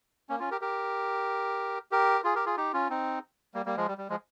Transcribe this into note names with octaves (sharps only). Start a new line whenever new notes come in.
A#3 C#4
C#4 F4
G4 A#4
G4 A#4
G4 A#4
F4 G#4
G4 A#4
F4 G#4
D#4 G4
C#4 F4
C4 D#4
G3 A#3
G3 A#3
F3 G#3
G3
G3
F3 G#3